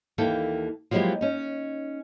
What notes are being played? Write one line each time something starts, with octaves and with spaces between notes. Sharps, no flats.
D#2 E3 A#3 A4 G5
F3 F#3 G#3 A#3 E4 G4
C#4 D#4